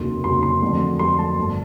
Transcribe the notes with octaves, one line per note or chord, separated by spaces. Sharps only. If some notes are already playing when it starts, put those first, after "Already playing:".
Already playing: F1 D#2 C#3 F#3 C6
F1 D#2 C#3 F#3 C6
C6
F2 D3 F#3 A3
F2 D3 F#3 A3 C6
A5
G1 D3